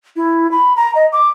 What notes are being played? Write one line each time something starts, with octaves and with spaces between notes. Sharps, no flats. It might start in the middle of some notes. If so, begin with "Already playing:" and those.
E4
B5
A#5
D#5
D6